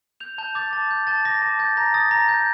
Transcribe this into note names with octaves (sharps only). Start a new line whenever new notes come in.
G6 F7
A5 G6
D6 A6
A5 A6
G6
A5 A6
D6 A#6
A5
G6 A6
A#5 A#6
D#6 A6
A#5 A#6
G6